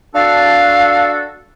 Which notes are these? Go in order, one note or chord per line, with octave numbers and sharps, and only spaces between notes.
D4 F#4 A4 F5